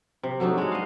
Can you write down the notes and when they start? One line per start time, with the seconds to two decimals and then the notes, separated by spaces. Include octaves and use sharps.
0.23 C3
0.40 F#3 A3 D4 D#4
0.58 G#3 F#4
0.72 D#5 F5